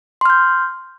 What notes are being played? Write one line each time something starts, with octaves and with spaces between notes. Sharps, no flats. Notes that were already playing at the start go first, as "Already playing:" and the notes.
C6 F6 G6